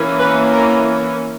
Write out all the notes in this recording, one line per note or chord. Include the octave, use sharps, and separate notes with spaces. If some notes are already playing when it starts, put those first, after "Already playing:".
Already playing: E3 A#3 C#4
B4
A#4